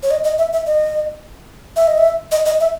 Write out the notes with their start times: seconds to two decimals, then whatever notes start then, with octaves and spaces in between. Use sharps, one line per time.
0.03 C#5
0.11 D#5
0.24 D#5
0.38 E5
0.52 E5
0.67 D#5
1.76 E5
1.88 D#5
1.98 E5
2.32 D#5
2.45 D#5
2.60 E5